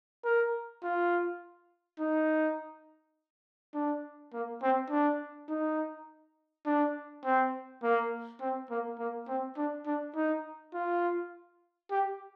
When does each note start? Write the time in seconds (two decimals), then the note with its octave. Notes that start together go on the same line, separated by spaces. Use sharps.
0.25 A#4
0.83 F4
2.00 D#4
3.74 D4
4.33 A#3
4.62 C4
4.90 D4
5.49 D#4
6.66 D4
7.25 C4
7.83 A#3
8.41 C4
8.70 A#3
8.99 A#3
9.28 C4
9.57 D4
9.86 D4
10.15 D#4
10.74 F4
11.91 G4